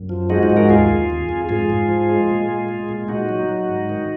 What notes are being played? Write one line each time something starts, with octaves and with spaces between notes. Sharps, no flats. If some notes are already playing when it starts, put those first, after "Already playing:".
Already playing: F#2
F3
G#3 D#4 F#4
D#4 F#4
G#2
F#4 A#4
D#2 F4 G#4
D#2
F2
F2
G#2 F4 G#4
G#2
F3
G#3
A#2
G#3
G#3
A#2
A#2 D#4 F#4
F#3
F#3
G#2
D#3